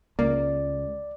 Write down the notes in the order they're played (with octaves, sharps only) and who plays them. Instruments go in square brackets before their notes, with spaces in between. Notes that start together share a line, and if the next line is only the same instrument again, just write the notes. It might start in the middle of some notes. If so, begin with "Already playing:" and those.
[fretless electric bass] C#2 [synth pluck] A#3 [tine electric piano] D5